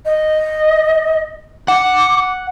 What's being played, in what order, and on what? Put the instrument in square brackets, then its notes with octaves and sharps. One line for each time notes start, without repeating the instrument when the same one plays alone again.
[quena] D#5
[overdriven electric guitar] F#5 [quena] D6